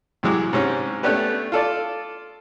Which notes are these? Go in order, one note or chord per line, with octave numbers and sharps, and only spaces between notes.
C2 E3 F#3 G#3 D6
G#2 C3 C#4
A3 B3 C#4 D4 G4 B4
F4 A4 D5